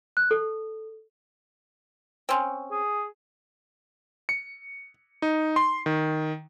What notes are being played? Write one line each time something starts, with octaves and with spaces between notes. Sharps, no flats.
F#6
A4
C4 C#4
G#4
C#7
D#4
C6
D#3